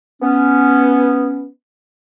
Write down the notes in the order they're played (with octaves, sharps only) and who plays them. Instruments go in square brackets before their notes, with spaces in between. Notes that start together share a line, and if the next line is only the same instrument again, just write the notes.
[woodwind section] B3 C#4